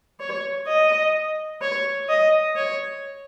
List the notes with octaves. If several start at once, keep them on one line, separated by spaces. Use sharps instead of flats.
C#5
D#5
C#5
D#5
C#5